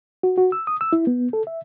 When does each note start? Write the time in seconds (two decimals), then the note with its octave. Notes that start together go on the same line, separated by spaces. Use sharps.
0.23 F#4
0.38 F#4
0.52 E6
0.67 D#6
0.81 E6
0.93 E4
1.07 B3
1.33 A4
1.47 E5